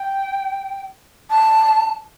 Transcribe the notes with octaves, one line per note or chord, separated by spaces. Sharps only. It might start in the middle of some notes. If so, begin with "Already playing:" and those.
Already playing: G5
A5